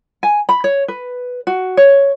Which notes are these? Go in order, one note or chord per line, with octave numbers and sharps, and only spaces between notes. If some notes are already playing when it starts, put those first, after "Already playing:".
G#5
B5
C#5
B4
F#4
C#5